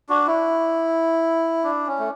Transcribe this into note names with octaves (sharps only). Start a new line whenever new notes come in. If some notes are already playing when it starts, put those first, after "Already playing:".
D4 F#4
E4
D4
C#4
A3